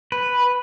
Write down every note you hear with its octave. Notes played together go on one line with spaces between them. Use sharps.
B4